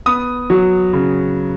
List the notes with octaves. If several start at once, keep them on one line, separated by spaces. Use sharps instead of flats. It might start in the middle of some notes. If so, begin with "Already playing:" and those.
B3 D#6
F#3
C#3